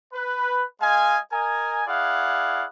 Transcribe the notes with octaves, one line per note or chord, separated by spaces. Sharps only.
B4
G#3 D#5 F5 G#5
A#4 D#5 G#5
E4 G#4 D5 F5 F#5